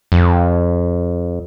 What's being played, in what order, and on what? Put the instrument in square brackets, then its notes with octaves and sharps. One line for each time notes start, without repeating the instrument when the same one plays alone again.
[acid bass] F2